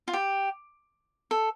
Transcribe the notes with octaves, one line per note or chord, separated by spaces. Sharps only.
F4
G4
A4